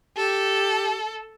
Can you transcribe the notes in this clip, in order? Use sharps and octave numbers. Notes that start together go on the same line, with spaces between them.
G4 A4